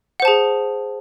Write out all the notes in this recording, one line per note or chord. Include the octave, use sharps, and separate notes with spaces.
G#4 C5 F#5 A5